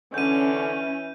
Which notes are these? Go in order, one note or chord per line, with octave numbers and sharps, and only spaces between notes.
D3 E3 C#4 G6 D#7